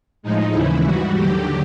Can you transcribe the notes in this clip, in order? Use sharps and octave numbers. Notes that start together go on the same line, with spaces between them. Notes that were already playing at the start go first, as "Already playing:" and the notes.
A2 F3 G#3 D#4
D#2 C#3 E3 E4
G#2 E3 G3 F#4
D#2 D3 F#3 G4